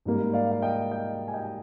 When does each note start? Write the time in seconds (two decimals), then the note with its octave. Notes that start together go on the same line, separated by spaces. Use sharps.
0.06 G#2 G3 A#3
0.33 D5 F5
0.52 F5
0.62 D#5 G5
0.91 D#5 G5
1.28 G#5
1.34 D#5 G5